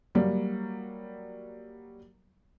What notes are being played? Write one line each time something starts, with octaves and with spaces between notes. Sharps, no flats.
F#3 G3 A#3